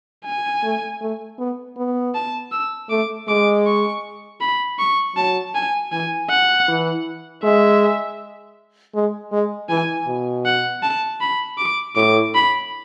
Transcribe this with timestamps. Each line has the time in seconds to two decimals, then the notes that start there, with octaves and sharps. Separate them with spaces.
0.25 G#5
0.63 A3
1.01 A3
1.39 B3
1.77 B3
2.15 A5
2.52 E6
2.90 A3 D6
3.28 G#3 D6
3.66 C#6
4.41 B5
4.79 C#6
5.16 F#3 A5
5.55 G#5
5.92 E3 G#5
6.30 F#5
6.68 E3
7.43 G#3 E5
8.95 G#3
9.32 G#3
9.69 E3 G#5
10.08 B2
10.45 F#5
10.83 A5
11.21 B5
11.58 D6
11.96 A2 D6
12.34 B5